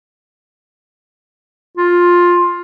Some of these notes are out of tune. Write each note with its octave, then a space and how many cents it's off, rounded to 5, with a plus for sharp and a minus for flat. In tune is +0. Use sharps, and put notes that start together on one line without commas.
F4 +10